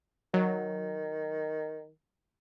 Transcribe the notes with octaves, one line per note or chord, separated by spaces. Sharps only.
D#3 F#3